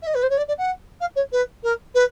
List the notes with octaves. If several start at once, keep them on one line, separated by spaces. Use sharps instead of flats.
E5
D#5
B4
C5
C#5
D5
D5
F#5
F5
C#5
B4
A#4
B4